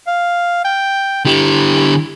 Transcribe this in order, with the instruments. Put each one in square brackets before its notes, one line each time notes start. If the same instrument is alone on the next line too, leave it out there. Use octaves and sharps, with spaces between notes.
[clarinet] F5
G5
[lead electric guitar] D3 G4 [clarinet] E4